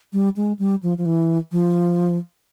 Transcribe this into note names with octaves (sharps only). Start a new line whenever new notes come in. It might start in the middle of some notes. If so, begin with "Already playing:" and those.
G3
G#3
G3
F3
F3
E3
F3